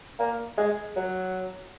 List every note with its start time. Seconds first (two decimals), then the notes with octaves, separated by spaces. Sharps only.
0.20 A#3
0.58 G#3
0.96 F#3